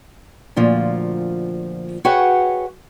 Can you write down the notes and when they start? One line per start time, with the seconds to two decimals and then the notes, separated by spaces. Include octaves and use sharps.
0.56 D2 A#2 F3
2.05 F#4 G#4 B4 C#5 F#5 G5